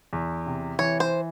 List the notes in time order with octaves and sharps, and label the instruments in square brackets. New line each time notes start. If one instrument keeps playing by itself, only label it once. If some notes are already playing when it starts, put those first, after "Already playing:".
[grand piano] E2
C3
[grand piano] E3 [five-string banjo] C#5
[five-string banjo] C5